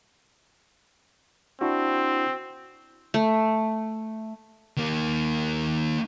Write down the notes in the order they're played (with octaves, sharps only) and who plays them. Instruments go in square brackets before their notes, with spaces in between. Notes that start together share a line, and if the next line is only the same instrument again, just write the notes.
[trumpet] C4 [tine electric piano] D4 E4 F#4
[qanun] A3
[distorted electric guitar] D#3 A#3